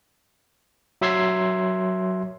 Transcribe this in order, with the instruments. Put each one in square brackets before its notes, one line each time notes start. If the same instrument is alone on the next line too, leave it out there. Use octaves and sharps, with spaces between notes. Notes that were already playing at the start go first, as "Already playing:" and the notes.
[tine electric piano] F#3 E5 C6 E6 G#6 C7